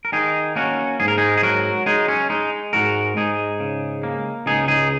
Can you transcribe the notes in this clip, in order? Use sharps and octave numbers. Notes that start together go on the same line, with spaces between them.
A#4
D#3 D#4 G#4
A#3 C#4 F#4
G#2 G#4
A#4
D#4 G#4
G#4
F#3 F#4 A#4
G#3 D#4 G#4
C#4
G#3 D#4
G#2 F#4 A#4
G#2 D#4 G#4
C#3
A#3
C#2 D#4 G#4
D#4 G#4